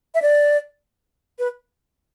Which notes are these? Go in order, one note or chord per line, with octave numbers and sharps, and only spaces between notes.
E5
D5
B4